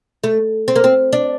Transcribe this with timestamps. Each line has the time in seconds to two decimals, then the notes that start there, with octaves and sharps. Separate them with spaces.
0.24 A3
0.68 C4
0.76 A#3
0.84 C4
1.13 D4